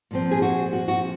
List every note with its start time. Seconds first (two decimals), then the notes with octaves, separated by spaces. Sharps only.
0.11 A#2 F3 C4
0.31 G#4
0.42 F#4
0.73 F#4
0.88 F#4